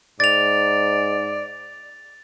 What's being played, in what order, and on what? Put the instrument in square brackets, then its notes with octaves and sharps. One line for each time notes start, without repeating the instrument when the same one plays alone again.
[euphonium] G#2 [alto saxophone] D5 [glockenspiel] A6 F7